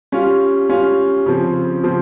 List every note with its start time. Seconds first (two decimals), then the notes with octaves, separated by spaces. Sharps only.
0.12 G3 C#4 F4
0.69 G3 C#4 F4
1.26 C#3 F3 C4
1.84 C#3 F3 C4